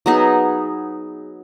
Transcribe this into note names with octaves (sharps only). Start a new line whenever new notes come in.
F#3 B3 D#4 G#4